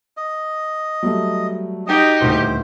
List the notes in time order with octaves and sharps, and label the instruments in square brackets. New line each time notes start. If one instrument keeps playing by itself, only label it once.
[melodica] D#5
[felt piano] F#3 G3 A3
[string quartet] D#4 F#4 G4 [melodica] D#5
[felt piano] D#1 D2 A2 [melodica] C5